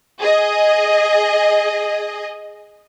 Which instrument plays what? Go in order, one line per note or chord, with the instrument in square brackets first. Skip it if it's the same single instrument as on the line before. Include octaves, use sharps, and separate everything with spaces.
[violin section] G#4 D#5